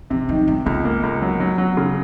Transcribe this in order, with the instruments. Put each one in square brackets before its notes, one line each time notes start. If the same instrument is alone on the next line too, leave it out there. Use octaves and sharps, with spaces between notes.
[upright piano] C3 [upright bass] F3
[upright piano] D#3 [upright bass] F#3
[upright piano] C3 [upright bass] G3
[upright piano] C#2 [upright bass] B3
[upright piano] A#3
C#2
F#3
F#3
F#3
C#3